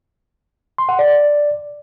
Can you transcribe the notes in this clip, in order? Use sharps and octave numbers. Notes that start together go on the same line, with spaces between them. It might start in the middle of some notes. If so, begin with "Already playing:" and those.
C6
F#5
D5